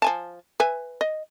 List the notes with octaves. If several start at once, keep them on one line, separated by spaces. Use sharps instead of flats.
F3 G#5 A5
B4 E5 G#5
D#5